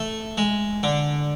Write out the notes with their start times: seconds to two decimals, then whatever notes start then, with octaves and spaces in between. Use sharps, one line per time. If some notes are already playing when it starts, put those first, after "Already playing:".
Already playing: A3
0.38 G#3
0.83 D3